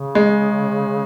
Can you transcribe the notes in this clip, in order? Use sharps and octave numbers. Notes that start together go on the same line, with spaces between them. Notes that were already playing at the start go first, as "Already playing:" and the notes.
Already playing: C#3
G#3